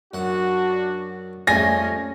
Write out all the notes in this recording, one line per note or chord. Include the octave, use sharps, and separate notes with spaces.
F#2 D4 F#4 F#5
F2 F3 G3 A3 C#4 G#5 A#6